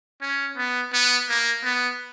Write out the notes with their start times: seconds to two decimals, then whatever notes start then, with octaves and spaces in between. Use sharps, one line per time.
0.21 C#4
0.57 B3
0.93 B3
1.29 A#3
1.64 B3